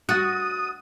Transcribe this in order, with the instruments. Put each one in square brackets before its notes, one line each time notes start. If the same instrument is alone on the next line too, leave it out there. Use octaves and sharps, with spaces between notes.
[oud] F#4 [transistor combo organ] D#6 [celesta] F#6 A6